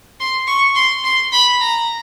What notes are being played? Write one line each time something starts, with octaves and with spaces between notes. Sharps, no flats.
C6
C#6
C6
C6
B5
A#5